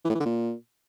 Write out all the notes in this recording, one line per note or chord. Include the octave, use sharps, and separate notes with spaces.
E3
A2
E3
D3
A#2